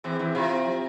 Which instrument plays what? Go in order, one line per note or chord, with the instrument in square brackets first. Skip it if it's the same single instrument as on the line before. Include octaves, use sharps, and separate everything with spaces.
[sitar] E2 E3 [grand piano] C4
[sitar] E2 E3 [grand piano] E4
[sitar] C3 [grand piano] F4
[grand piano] C4
F3